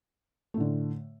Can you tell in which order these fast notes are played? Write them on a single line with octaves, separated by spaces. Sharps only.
A3 A2 D3